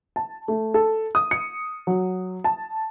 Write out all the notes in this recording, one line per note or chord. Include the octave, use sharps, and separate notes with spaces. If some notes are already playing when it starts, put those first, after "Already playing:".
A5
A3
A4
D#6
C#7
F#3
A5